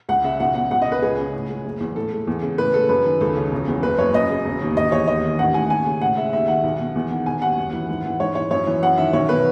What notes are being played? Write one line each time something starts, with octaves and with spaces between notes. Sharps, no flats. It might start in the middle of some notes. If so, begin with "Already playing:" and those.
C#2 F#5
C#3 E5
B1 F#5
B2 F#5
C#2 F#5
D#5
C#3 B4
C#2 G#4
C#3
A2
G#3
F#1
E2
A2 A4
G#3
E2
C#3
A2 B4
G#3 A4
F#2 B4
D#3
C#2 A4
C#3
E1
E2
F#1 B4
F#2 C#5
F#2 D#5
C#3
E1
D#2
E1 D#5
E2 C#5
D#2 D#5
D#3
A1 F#5
A2 G#5
D#2 G#5
C#3
A2 F#5
G#3 E5
D#2 E5
D#3 F#5
B1
B2
E2
D#3
E1 G#5
D#2 F#5
F#2
E3
G#2
E3
G#2 C#5
E3 C#5
F#2 C#5
E3
F#2 F#5
D#3 E5
B1 C#5
B2 B4